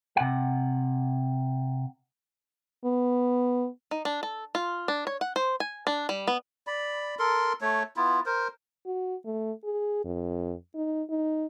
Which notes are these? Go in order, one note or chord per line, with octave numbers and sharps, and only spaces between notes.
C3 F#5
B3
D#4
D4
A4
F4
D4
C#5
F#5
C5
G#5
D4
G3
B3
D5 B5
A4 A#4 C6
A3 C#5
B3 E4 F4
A#4 C5
F#4
A3
G#4
F2
D#4
D#4